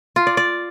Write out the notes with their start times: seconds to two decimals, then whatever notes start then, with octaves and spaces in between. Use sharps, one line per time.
0.16 F4
0.27 D5
0.37 D5